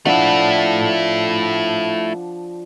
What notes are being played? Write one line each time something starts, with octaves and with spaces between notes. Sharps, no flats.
F3 A3 D4 E4 F#5